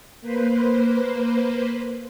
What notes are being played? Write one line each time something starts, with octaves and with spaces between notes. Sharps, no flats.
A#3 B4 C5